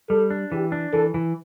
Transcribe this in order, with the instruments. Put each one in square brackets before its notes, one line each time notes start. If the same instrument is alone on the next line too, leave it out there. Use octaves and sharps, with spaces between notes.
[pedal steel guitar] G3 [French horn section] A4
[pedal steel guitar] D4
[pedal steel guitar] E3 [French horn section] G4
[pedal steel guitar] D4
[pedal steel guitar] E3 [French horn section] A4
[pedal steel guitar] E3